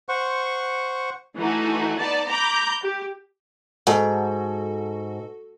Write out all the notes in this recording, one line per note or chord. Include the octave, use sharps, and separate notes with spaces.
C5 F#5 C#6
E3 A3 D#4 F#4
B3 D#4 D5 A5
A#5 B5 D6 G6
G4
G#2 F#4 A4